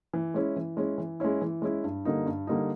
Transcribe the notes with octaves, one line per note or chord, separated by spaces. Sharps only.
E3
G#3 C#4 E4
E3
G#3 C#4 E4
E3
G#3 C#4 E4
E3
G#3 C#4 E4
G2
D3 G3 A#3 D#4
G2
D3 G3 A#3 D#4